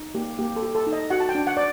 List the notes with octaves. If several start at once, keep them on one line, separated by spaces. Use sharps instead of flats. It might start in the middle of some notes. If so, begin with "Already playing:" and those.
Already playing: D#4
A#3 G4
A#3 G4
A4
G4
A4
D#4
D#5
F#4 F#5
A5
G5
D4
F#5
D5